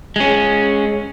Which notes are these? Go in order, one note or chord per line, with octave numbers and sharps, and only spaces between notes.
G#3 C#4